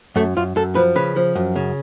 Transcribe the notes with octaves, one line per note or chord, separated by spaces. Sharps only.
F#2 A3
F#2 F4
F#2 A4
F3 B4
C#3 B4
F3
F#2
C#3